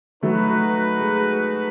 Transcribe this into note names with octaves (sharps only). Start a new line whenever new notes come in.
F#3 A3 D#4 F#4 B4 F#5
G#3